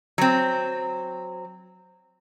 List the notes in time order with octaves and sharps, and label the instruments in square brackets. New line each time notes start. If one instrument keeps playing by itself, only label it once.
[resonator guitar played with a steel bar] F#3 C4